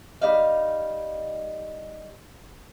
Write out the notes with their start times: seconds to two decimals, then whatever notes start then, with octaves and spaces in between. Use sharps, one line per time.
0.22 G3 D#4 F5